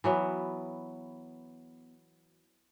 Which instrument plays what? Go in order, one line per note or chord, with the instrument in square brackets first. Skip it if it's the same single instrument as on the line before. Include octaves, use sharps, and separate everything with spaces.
[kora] E3 F#3 B3